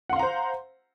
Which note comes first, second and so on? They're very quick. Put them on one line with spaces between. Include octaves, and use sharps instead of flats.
F#5 C6 F5 A#5 C5